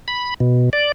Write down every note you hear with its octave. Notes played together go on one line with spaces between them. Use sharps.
B5
B2
D5